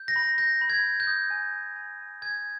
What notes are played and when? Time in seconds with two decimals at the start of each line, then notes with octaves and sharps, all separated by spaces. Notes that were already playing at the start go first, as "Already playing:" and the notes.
Already playing: G6
0.08 A#6
0.16 B5
0.38 G6 A#6
0.61 B5
0.70 G#6
0.84 G6
1.00 G6
1.07 D#6
1.30 G#5
1.53 G6
1.76 G#5
1.99 G#5
2.22 G#5 G#6